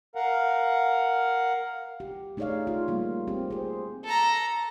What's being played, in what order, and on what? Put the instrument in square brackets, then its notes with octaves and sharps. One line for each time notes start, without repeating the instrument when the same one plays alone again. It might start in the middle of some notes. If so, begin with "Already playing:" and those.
[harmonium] A#4 F5 F#5
[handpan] G4
A3 D#4 G#4 C#5 D5 F5
F4
G3 A#3 F4
C4 G4
G#4 C5
[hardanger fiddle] A4 A#5